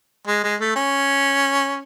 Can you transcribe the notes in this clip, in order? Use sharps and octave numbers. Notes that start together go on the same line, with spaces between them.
G#3
G#3
A3
C#4